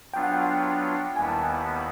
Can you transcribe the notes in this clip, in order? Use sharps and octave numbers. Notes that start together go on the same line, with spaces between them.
F#3 B3 D4 F4 G5
F#5
G5
D#2 D#3 G3 B3 E4 G#5
A5
G#5
A5
B5